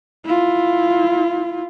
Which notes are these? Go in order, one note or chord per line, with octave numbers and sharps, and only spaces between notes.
E4 F4